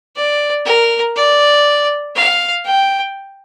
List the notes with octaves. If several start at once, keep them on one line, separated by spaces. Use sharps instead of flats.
D5
A#4
D5
F5
G5